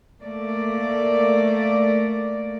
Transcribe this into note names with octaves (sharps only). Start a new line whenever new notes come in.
A3 A#3 D5